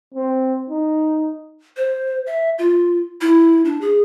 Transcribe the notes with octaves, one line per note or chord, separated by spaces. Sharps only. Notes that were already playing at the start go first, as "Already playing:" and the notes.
C4
D#4
C5
E5
F4
E4
D4
G#4